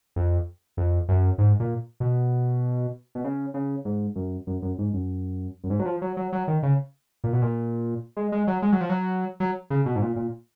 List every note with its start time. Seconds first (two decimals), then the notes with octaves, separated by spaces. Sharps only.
0.16 F2
0.77 F2
1.09 F#2
1.38 G#2
1.60 A#2
2.00 B2
3.15 B2
3.24 C#3
3.54 C#3
3.85 G#2
4.16 F#2
4.47 F#2
4.62 F#2
4.78 G#2
4.94 F#2
5.64 F#2
5.70 G#2
5.80 F#3
5.85 F3
6.02 F#3
6.17 F#3
6.32 F#3
6.48 D#3
6.63 C#3
7.24 A#2
7.33 B2
7.42 A#2
8.17 G#3
8.32 G#3
8.47 F#3
8.62 G#3
8.72 F#3
8.81 F3
8.90 F#3
9.40 F#3
9.70 C#3
9.86 B2
9.96 G#2
10.02 A#2
10.16 A#2